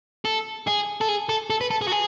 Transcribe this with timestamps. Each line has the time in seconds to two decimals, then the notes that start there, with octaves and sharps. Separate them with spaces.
0.25 A4
0.67 G#4
1.01 A4
1.08 G#4
1.29 A4
1.50 A4
1.61 B4
1.71 A4
1.81 G#4
1.88 F#4
1.92 G#4